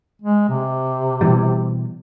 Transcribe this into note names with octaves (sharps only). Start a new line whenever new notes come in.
G#3
C3
B2 E3 G3